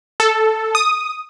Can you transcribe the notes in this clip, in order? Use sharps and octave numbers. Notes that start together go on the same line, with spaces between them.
A4
D#6